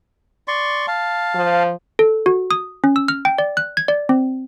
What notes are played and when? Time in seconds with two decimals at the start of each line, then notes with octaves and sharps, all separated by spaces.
0.48 D5 C6 C#6
0.88 F5 A5
1.35 F3
1.99 A4
2.26 F#4
2.51 D#6
2.84 C#4
2.96 E6
3.08 F6
3.25 G5
3.38 D5
3.57 F#6
3.77 G#6
3.88 D5
4.09 C4